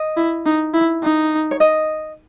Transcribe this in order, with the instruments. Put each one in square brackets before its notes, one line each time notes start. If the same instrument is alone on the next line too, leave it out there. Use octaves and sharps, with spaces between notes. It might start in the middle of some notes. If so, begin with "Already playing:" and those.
Already playing: [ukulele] D#5
[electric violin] E4
D#4
E4
D#4
[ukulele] C#5
D#5